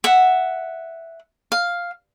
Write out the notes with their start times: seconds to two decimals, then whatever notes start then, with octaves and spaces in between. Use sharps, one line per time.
0.04 E5 F#5
1.52 F5